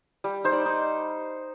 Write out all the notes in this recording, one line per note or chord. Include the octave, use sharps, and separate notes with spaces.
G3
D#4 C5
D5
D#4